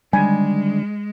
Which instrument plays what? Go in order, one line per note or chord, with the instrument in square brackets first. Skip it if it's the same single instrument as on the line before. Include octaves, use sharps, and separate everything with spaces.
[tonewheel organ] D3 D#3 D4 [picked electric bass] G3 [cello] G#3 [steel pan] G#5